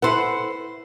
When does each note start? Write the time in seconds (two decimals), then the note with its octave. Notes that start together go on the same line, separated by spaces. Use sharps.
0.02 E4 A4 B4 C5 F#5